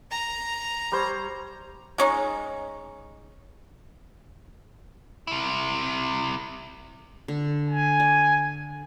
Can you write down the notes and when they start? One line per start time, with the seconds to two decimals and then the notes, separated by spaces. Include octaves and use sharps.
0.11 A#5
0.92 G3 C5 C#5
1.98 G#3 C#4 D#4
5.27 C3 E4
7.28 D3
7.70 G#5
8.00 D5